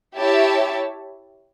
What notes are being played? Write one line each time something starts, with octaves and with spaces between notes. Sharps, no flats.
E4 G4 C#5 E5 A5